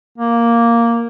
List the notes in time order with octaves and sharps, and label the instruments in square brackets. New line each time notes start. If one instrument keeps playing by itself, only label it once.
[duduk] A#3